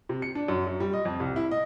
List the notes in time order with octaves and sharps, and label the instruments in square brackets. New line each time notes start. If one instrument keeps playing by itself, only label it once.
[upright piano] C3
C#7
D4
F#2
F#2
G3
D#5
F2
C2
E4
D#5